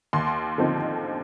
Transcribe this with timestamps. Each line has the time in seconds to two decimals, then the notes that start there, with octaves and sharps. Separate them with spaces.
0.13 D#2 C6
0.58 D3 F3 C4 D#4